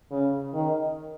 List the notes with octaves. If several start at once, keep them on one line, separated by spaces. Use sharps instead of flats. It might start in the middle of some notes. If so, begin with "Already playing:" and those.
C#3
D#3